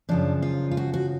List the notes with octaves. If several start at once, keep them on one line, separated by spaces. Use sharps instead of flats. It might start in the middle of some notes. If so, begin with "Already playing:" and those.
F#2 C#3 F3 D4
F4
F4
F#4
F#4